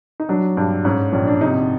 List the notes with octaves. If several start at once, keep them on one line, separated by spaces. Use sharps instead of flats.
D#4
F#3 D4
G2 D4
G#2 C#4
A#1 C#4
D4
C3 D#4